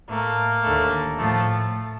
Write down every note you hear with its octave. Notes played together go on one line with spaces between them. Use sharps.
A2 A3 A#3
D#2 D3 A3
A2 F3 A3